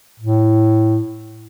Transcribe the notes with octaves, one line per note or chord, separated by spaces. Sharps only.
A2